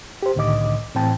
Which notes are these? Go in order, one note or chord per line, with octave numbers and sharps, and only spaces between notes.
G4 C5
C2 A2 D3 D#3 D#5 D6
A2 E3 C4 G5 A5